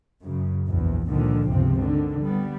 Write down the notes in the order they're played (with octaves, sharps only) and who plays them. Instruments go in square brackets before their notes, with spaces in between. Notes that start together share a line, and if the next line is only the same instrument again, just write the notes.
[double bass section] F#2 C#3
A#1 E2
C#2 A#2 D3 D#3 F3
G1 C#2 C3 F3 C4
D3 D#3
G3 B3